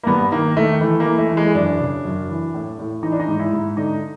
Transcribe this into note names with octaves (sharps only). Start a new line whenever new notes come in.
A#3
G2 B3
D#3 A#3
D#3 A3
E3 A3
A#3
E3
A3
E3
G#3
F#2 D4
C#3
F#2
E3
A2
A2
E3 D#4
D4
D#4
G#2
E4
G#2
D3 D#4